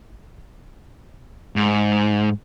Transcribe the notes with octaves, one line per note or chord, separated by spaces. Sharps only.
G#2